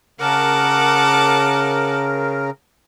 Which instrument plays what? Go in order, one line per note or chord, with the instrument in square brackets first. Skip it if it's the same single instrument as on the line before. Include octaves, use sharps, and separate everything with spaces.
[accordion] C#3 A#4 [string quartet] F#5 A5 D6